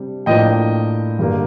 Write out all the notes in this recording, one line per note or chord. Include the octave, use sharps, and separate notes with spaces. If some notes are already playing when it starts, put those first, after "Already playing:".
Already playing: C3 G3 D4
A2 F3 A#3 D4 D#5 G5
G2 D3 G3 A#3